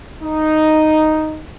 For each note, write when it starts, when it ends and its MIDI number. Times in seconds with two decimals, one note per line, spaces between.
0.23 1.43 63